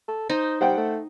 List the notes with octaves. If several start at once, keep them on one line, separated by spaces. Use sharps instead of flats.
A4
D#4 C5
G3 C5 F#5 G5
A3